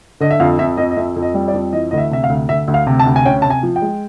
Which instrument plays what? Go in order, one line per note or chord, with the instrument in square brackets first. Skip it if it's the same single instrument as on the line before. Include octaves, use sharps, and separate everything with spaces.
[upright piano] D3 D#5
E5
F2 F5
F2 E5
F2 D#5
D#5
F2 E5
F2
D#5
G3
D5
F2
E3 D#5
D2 D#5
E5
C3 E5
F5
D2
D2 E5
D2
F5
C3
A5
D2
G#5
C#4 G5
C3 A5
G#5
F3
G5
G#3